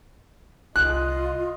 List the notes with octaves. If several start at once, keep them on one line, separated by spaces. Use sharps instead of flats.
C2 F4 D#5 F#6